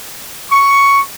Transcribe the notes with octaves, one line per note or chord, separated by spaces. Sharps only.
C#6